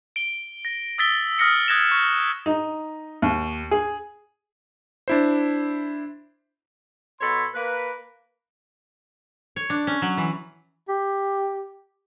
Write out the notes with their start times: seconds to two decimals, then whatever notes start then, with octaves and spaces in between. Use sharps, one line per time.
0.16 D7 G7
0.65 A#6
0.98 D#6 E6 A6 B6 G7
1.39 D#6 F6 A#6 B6 C#7
1.68 D#6 F#6 G#6 A#6 E7
1.91 C#6
2.46 D#4
3.22 D#2
3.71 G#4
5.08 D4 E4 C5
7.21 B2 A4 C#5 B5 C6
7.54 A#3 B4
9.56 C#5
9.70 D4
9.87 C#4
10.02 F#3
10.17 E3
10.89 G4